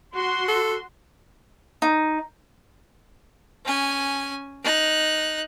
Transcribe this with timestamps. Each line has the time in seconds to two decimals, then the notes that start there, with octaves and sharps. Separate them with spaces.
0.15 F#4 C6
0.48 A4
1.82 D#4
3.65 C#4 G#5
4.63 D#4 F#6